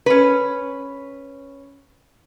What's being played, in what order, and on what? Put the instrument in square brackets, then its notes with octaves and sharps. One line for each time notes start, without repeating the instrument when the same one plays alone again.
[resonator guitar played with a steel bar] C#4 B4